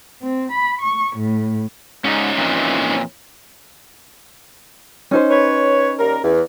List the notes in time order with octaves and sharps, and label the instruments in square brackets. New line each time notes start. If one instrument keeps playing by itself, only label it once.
[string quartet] C4
B5
C#6
A2
[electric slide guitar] G#2 [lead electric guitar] C#4 D#4
[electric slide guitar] F2 A#2 E3
[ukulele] C#4 D#4 C5
[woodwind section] B4 C#5
D#2 G3 A#4
E2